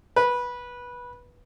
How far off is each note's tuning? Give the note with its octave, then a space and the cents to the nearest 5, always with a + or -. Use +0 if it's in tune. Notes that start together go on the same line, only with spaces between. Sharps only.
B4 -15